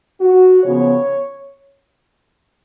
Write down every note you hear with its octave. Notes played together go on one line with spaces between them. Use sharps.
F#4
C#3 F3 B3 C#5